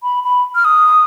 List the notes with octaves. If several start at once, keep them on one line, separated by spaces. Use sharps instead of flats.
B5
B5
F6
D#6